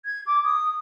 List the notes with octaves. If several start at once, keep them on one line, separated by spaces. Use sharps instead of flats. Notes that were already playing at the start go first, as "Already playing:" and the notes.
G#6
D6
D#6